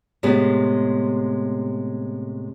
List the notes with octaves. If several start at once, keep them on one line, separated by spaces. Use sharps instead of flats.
A2 C3 G#3 B3